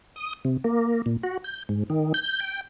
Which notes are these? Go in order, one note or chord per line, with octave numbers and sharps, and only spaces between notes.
D#6
C3
A#3
A#2
F#4
G6
G#2
D#3
G6
G5